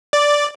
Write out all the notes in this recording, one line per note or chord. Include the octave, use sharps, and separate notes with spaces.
D5